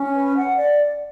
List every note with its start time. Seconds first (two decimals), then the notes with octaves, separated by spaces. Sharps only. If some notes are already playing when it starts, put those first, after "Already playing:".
Already playing: C#4
0.13 B4
0.34 F#5
0.57 D5